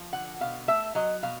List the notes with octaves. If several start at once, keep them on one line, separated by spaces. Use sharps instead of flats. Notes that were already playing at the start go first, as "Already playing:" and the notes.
Already playing: F3
D3 F#5
B2 F5
A3 E5
F#3 D#5
B2 F5